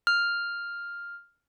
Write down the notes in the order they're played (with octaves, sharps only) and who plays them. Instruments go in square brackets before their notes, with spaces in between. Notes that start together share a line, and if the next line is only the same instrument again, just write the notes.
[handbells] F6